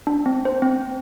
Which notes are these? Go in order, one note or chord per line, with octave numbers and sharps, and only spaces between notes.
D4
C4
C5
C4